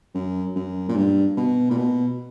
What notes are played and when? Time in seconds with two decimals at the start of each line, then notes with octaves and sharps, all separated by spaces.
0.15 F#2
0.55 F#2
0.89 A#2
0.96 G2
1.37 B2
1.70 A#2
1.77 B2